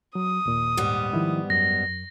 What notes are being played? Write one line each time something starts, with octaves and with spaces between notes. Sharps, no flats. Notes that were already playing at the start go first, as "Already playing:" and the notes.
F#3 D#6
D#2 A#2
G#2 G3 B3
D#3 F3 E4
F#2 A#6